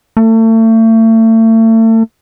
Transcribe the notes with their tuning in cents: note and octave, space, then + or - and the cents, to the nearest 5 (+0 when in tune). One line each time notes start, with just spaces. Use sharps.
A3 +35